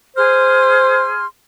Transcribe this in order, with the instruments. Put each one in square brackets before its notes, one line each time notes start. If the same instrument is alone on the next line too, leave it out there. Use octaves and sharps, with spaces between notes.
[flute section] G#4 C6 F6 [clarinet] C5